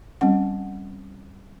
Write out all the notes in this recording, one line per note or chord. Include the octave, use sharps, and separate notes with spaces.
G3 C4 C#4 F#5